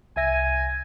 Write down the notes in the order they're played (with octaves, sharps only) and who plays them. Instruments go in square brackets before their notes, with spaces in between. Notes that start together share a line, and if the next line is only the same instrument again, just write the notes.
[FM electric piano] C2 E5 A#6 [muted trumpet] G#5